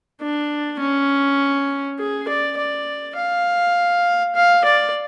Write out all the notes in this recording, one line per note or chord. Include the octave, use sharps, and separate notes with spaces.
D4
C#4
G#4
D5
D5
F5
F5
D5